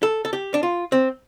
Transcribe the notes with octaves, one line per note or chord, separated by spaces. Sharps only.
A4
A4
G4
D4
F4
C4